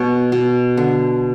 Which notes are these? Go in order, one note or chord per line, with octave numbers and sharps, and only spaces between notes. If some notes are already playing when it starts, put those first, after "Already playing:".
Already playing: B2 C#5
B2
D3